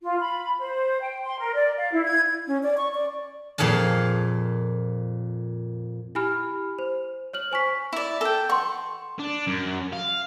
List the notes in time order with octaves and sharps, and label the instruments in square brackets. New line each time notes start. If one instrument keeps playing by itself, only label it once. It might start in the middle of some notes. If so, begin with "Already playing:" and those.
[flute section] F4
B5
C5
G5
C6
A#4
D5
F5
E4
G#6
[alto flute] C#4
D5
C#6
D5
[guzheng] F2 A#2 G#4 F5 A5
[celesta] E4 G4 G#5 B5 F6
C5
C#5 F6 F#7
C5 G#5 C#6 B6
[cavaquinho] E4 D5
A4 G5
[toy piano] F#5 C6 [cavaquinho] C#6
[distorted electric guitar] D4
F#2
F5